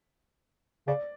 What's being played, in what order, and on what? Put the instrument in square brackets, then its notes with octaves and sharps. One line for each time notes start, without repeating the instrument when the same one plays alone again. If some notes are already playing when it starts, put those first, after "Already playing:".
[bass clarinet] C#3 [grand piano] D5